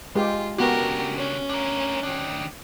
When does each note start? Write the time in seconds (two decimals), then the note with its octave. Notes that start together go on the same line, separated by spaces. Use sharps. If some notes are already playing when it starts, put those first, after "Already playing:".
0.15 G#3 F4 G4
0.58 C#3 B3 D4 F#4 G4 A#4
1.18 C#4
1.49 D4 A#4
2.03 D#3 D4